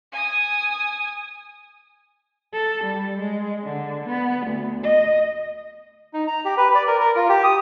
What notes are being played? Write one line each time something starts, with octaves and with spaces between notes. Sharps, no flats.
G#5 D#6
A4
G3
G#3
D3
B3
D2
D#5
D#4
A#5
G4
B4
D5
A#4
A#4
F4
G4
D#6